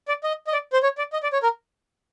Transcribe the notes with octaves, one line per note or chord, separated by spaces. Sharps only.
D5
D#5
D#5
D5
C5
C#5
D5
D#5
D5
C#5
A#4